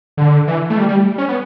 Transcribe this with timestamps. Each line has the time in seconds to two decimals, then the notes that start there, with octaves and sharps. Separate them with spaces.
0.17 D3
0.47 E3
0.70 A3
0.78 G3
0.88 G3
1.18 C#4
1.28 B3